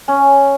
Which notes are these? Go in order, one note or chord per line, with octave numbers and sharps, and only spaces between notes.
C#4